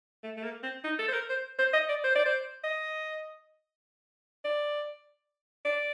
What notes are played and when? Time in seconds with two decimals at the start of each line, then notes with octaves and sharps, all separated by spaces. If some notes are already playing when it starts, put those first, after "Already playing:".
0.24 A3
0.37 A3
0.43 A#3
0.63 C4
0.84 D#4
0.99 A4
1.08 C5
1.13 A#4
1.29 C5
1.59 C5
1.73 D#5
1.89 D5
2.04 C5
2.15 D5
2.26 C5
2.64 D#5
4.45 D5
5.65 D5